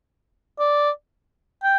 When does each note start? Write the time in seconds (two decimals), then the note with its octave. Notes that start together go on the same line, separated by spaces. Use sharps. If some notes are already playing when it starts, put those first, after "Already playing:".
0.59 D5
1.63 G5